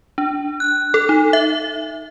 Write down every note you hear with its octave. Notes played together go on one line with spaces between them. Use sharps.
D4
F#6
A4
D#4
E5